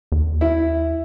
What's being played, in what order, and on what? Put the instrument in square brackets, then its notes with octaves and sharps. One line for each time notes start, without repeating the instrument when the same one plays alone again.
[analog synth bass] D#2
[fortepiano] E4